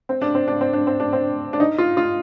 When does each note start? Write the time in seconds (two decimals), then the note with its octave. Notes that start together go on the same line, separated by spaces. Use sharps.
0.09 C4
0.22 D4
0.35 C4
0.48 D4
0.61 C4
0.73 D4
0.87 C4
1.00 D4
1.13 C4
1.53 D4
1.60 D#4
1.78 F4
1.97 F4